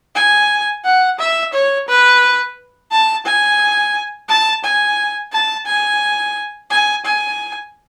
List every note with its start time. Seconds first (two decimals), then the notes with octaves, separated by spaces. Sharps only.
0.15 G#5
0.85 F#5
1.19 E5
1.53 C#5
1.88 B4
2.91 A5
3.26 G#5
4.29 A5
4.64 G#5
5.33 A5
5.66 G#5
6.71 G#5
7.06 G#5